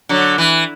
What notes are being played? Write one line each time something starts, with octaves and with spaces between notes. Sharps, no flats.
D3 F#3
E3